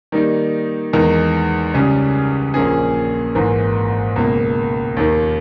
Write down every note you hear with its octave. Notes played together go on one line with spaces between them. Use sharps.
D#3 G3 A#3 D#4
E2 D#3 G#3 D#4 A#4
C#2 C#3 G3 C#4 G#4
A#1 A#2 A#3 C#4 G#4
G#1 G#2 E3 A#3
C#2 B2 A#3
D#2 D#3 A#3